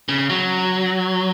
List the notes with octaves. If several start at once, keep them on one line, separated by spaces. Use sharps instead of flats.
C#3
F#3